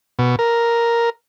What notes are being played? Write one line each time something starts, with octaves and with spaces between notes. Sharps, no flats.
B2
A#4